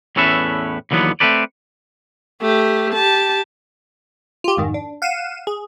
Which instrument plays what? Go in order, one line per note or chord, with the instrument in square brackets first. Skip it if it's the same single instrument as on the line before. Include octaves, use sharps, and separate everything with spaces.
[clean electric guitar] E2 A2 C#4 A4 B4 E5
D#2 D3 E3 F#3 B3
A3 A#3 C4 A4 B4 D5
[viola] A3 G4
G4 A5
[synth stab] F4 G4
F2 G#2 D#3
D4
F5 F#5 D#7 E7
G#4